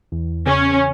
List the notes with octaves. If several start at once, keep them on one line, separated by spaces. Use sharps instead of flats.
E2
C#3 C#4